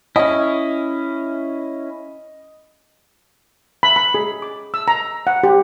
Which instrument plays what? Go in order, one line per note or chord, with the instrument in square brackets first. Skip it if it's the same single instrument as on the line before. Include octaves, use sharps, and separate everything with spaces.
[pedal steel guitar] C#4 E4 [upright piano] D#5
[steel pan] B5
B5
G#4
D6
E6
A#5
F#5
G4